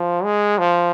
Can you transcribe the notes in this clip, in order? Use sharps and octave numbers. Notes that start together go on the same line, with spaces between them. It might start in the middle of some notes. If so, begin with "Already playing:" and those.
Already playing: F3
G#3
F3